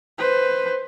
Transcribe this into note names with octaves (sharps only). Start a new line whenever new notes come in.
B4 C5